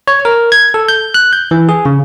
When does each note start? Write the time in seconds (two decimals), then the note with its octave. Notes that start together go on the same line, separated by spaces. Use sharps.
0.08 C#5
0.25 A#4
0.52 G#6
0.74 A4
0.88 G6
1.14 F#6
1.33 G6
1.51 E3
1.69 G#4
1.85 C#3